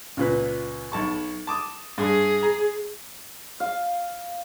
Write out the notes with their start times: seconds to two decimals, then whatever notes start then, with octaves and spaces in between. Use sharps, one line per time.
0.17 C#2 A#2 B4
0.92 B1 A5 C#6
1.47 A5 D6 D#6
1.98 G2 G#4
2.43 A#5
3.60 F5